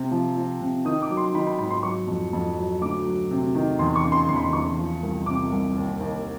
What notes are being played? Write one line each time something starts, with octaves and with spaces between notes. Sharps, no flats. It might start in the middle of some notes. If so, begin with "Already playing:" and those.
Already playing: C3
F3
F3
C3
D#3 D#6
D6
F#3
C6
D#3 B5
B5
G#2 B5
C6
F#3 C#6
F2
F2
F#3
D2 D6
F#3
C3
D#3
E2 C6
C#6
C#3
C6
E2 C6
B5
C6
E2 C#6
F3
C2
C3 D6
C2
D#2
D#2